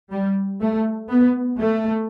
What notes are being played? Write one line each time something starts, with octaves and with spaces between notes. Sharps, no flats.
G3
A3
B3
A3